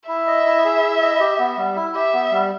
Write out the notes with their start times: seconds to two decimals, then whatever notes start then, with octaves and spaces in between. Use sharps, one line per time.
0.08 E4 E5
0.27 D#5
0.46 E4
0.65 G#4
0.84 E4
1.02 D#5
1.20 G4
1.39 B3
1.57 G3
1.76 E4
1.95 G4 E5
2.14 B3
2.31 G3